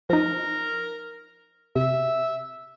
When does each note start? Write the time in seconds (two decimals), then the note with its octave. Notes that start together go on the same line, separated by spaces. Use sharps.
0.10 F3 D#4 A#4
1.76 C3 E5